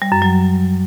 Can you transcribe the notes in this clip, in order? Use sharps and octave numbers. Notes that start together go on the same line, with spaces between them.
G3
F#2
F#3